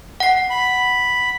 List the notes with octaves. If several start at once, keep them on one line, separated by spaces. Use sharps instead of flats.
F#5 C7
B5